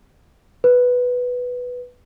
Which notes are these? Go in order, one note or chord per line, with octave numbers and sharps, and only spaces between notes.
B4